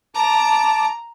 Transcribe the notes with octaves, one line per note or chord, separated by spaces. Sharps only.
A5 A#5 D6